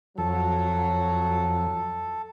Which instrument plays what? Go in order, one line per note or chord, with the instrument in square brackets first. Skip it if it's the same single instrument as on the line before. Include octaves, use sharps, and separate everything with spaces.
[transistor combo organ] F2 [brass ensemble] F#3 [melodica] A4